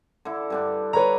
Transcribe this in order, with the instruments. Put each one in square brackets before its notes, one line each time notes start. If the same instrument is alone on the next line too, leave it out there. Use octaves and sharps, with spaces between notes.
[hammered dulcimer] D3 E4
G2 D3 D4
[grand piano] B4 C#5 A#5